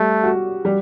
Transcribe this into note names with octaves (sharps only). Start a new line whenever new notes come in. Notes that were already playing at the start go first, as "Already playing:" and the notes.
Already playing: G3 A3
F#4
G3